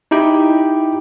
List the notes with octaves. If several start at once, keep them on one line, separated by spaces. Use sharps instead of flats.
D#4 E4 G4 G5